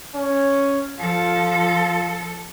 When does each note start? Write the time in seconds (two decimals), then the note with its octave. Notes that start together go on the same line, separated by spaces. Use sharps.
0.16 C#4
0.99 F3 F4 A4